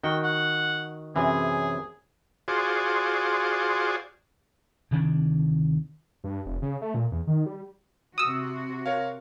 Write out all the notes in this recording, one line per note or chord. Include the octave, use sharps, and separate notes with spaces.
D#3 F#4 G5
F#5
F#2 C3 E3 G#4
F4 F#4 G#4 C5 D5
D2 C3 D#3 D4
G2
F1
C#3
A3
A#2
E2
D#3
G3
C3 F#4 D#6 E6
A#4 C#5 F5